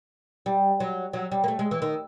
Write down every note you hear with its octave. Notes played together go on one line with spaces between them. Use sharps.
G3
F#3
F#3
G3
A#3
A3
G#3
E3
D#3